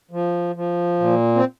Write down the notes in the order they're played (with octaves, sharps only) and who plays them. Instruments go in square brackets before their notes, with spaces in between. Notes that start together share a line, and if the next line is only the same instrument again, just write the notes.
[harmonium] F3
F3
A#2
C4